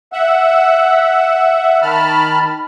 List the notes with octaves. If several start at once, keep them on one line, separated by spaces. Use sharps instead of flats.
E5 F#5
D#3 A5 B5 F6